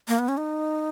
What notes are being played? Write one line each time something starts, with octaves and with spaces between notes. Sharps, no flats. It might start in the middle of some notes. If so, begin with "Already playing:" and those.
A#3
B3
C#4
D#4